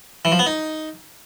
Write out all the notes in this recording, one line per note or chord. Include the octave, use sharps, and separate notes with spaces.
E3
F3
B3
D#4